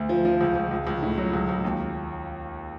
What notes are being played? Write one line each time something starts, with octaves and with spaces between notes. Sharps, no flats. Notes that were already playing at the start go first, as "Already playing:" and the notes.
Already playing: D2
F3
F3
C#2
C#2
C#2
C#2
A2
F#3
C#2
C#2
D#2